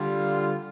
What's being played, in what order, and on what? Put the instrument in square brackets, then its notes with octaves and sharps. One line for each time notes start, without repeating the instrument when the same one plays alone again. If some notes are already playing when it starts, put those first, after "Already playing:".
Already playing: [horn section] D3 G3 F4